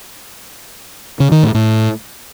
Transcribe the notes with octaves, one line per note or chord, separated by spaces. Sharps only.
C#3
D#3
A2
A2